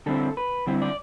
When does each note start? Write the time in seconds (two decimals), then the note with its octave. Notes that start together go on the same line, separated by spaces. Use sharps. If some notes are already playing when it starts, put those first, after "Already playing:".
0.06 D3 G3 C4 E4 A4
0.37 B4
0.67 D3 G3 C4 E4
0.82 D5